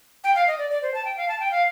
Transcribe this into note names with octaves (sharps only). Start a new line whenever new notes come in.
G5
F5
D#5
D5
D5
C5
A5
G5
F5
A5
G5
F5